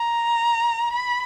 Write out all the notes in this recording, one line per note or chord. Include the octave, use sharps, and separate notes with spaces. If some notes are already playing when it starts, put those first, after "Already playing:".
Already playing: A#5
B5